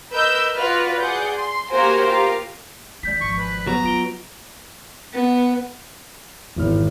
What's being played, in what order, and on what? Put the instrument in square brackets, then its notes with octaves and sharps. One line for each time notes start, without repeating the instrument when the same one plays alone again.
[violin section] A#4 B4 D#5 E6 G6
F4 F#4 B4 D5 F6
G#4 D5 F#5 G6
C6
A#3 F#4 G4 A#4 C5 G#5
F4 G4 A#4 F5
[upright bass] D#2 G#3 [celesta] D5 G6 B6
[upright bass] G#1 F3 [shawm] C#6
[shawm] B4
[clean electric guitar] F#3 B3 [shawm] A#5
[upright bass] C4 [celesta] F4 D7 G7
[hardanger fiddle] B3
[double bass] G#1 [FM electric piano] E2 E4 F6